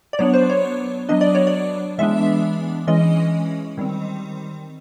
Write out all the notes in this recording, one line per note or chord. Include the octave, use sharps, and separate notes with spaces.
D5
F#3 B3 D4 C#5
C5
C#5
F#3 B3 D4 D#5
D5
C#5
D5
E3 G#3 B3 D4 E5
E3 G#3 C#4 D#5
D#3 G3 C4